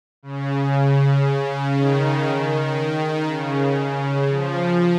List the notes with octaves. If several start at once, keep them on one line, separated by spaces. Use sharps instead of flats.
C#3
D#3
C#3
C#3
F3